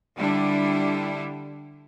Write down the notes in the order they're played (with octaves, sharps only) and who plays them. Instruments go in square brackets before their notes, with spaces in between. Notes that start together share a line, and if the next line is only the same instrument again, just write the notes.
[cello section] D3 G3 D4 E4